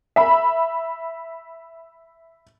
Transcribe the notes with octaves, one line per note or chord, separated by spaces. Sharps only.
E5 B5